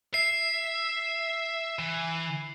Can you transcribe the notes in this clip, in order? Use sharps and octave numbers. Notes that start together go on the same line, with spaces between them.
E5 C7
E3